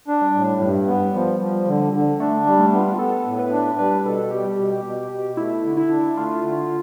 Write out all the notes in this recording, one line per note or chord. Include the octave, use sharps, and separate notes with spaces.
D4
G3
A2
G2 G3
B3
F3
F3
D3
D3
A3 D4
G3
A3
B3
F4
B3 A4
A2
B4
D4
G3 B4
B2 A4
G3 G4
B2
B2
B2
A3 E4
D3
E4
D4
A3 F4
D3